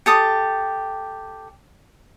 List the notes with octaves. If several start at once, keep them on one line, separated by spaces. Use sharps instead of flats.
G4 A4 D#6